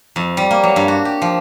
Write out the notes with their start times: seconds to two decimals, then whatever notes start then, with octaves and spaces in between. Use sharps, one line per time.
0.16 F2
0.37 G3
0.51 A#3
0.63 F#3
0.76 G2
0.88 F#4
1.05 G4
1.22 F3